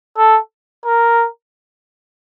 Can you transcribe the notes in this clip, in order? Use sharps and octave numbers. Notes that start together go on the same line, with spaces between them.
A4
A#4